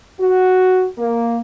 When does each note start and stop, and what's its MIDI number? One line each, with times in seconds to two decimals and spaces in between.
0.19 0.86 66
0.98 1.40 58